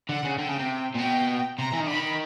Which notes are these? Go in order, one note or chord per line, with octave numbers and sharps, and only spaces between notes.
D3 F#5
C#3
D3 G5
C#3
C3
A#2
B2 G5
C3 A#5
E3
D#3
D3 B5
D#3